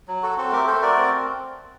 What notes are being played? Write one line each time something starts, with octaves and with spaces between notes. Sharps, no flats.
F#3
F#4 A4
C4 F#4 A4
A3 G4 A#4
A3 A4 C5
F#4 A#4 D5
C4